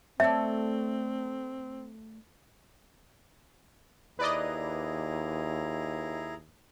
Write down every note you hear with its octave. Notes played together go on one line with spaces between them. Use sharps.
A3 C4 C#5 D5 E5
D#2 E4 G#4 B4 D5 D#5 A#5